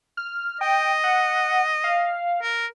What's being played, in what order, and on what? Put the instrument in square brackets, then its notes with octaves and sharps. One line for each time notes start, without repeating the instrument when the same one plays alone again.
[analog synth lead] F6
[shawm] D#5 [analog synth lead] G5
[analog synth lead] F#5
F5
[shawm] A#4